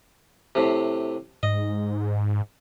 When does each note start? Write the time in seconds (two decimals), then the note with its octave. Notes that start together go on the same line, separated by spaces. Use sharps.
0.55 A2 C3
1.43 G#2 D#5